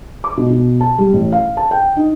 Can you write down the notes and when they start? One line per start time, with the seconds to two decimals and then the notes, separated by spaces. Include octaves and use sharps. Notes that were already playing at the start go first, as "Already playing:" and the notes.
0.24 D6
0.37 B2
0.50 B2
0.81 A5
0.98 G3
1.13 A1
1.32 F5
1.57 A5
1.71 G5
1.97 D#4